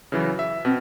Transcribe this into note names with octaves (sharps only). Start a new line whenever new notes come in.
C#3 E3 F#3
E5
B2 C4